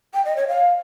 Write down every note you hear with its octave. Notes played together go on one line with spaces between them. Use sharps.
G5
D#5
C#5
F5